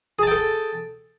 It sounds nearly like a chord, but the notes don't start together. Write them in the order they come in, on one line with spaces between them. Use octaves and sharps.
G#4 A5 G5 A4